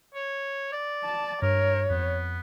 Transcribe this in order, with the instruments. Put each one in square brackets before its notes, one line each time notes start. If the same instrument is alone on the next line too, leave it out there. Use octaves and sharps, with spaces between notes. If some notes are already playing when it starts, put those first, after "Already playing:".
[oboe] C#5
D5
[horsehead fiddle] A5
[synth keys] G2 [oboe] A#4 [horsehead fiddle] C#5
[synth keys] F2 [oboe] B3